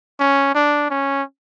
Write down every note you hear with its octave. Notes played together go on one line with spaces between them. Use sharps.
C#4
D4
C#4